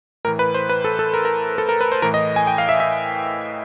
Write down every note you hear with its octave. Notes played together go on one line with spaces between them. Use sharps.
A2 E3 A#4
B4
C5
B4
A4
A4
A#4
A#4
A4
A#4
B4
C5
A2 E3 A#4
D#5
G#5
G5
F5
E5
E5